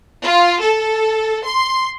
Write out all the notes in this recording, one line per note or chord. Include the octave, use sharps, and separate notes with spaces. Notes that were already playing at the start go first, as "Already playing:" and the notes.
F4
A4
C6